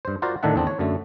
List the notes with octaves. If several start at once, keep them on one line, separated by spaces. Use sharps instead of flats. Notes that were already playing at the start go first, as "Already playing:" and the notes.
G2 C5
F4 F#4 A#4 C5 D5 F5
A2 D3 D#3 D4 E5 F#5
E2 C4 D4
C#5
F#2 D3 A3